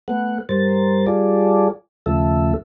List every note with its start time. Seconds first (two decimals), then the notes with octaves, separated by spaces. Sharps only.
0.08 A3 B3 F#5
0.49 G2 G3 A#4 C5 A6
1.07 G3 F4 G#4 A4 D5
2.06 D#2 C#3 F3 A3 A4 E5